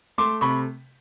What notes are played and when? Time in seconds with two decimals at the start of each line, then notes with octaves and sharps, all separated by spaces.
0.18 A3 C6 D6
0.41 C3 B5 C#6